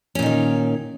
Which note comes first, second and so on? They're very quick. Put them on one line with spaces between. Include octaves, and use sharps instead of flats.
C#4 A#2 D#4 D#3